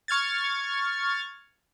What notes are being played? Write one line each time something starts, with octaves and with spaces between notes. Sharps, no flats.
C#6 F6 G#6 A6